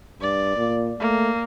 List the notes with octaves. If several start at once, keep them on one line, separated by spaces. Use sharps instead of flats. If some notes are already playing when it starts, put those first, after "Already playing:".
G2 D5
A#2
A3 A#3